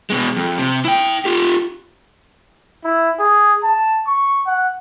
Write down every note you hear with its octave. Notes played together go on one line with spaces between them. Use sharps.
B2 G#3
F2
C3
E4 G5
F4 G4
E4
G#4
A5
C#6
F#5